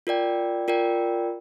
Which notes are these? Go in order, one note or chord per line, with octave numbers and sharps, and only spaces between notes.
F4 A#4 D5 G5
F4 A#4 D5 G5